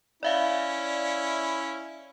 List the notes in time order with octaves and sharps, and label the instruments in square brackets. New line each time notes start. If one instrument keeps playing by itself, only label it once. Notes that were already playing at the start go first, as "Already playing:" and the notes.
[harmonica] C#4 E4 [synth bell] D5 E5 F5